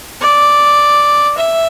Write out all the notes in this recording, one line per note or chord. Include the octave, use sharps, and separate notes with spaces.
D5
E5